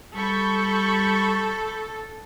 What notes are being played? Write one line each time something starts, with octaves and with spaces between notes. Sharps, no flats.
G3 A4 B5 C#6 G6